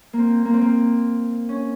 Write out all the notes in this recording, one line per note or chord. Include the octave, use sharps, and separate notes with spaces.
A#3
C4
A#3
C4
A#3
C#4